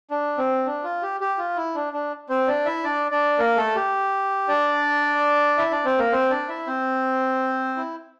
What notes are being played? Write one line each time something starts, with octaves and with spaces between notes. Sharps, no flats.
D4
C4
D4
F4
G4
G4
F4
E4
D4
D4
C4 C5
D4 D5
E4 E5
D4 D5
D4 D5
A#3 A#4
A3 A4
G4
D4 D5
E4 E5
D4 D5
C4 C5
A#3 A#4
C4 C5
D4 D5
E4 E5
C4 C5
E4